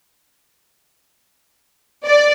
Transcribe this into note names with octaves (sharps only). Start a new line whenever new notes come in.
D5